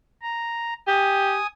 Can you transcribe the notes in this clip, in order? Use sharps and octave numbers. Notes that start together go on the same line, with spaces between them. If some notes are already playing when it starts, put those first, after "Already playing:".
A#5
G4 G#5 D#6